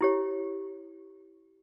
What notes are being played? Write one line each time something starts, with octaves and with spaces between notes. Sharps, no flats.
E4 G4 C#5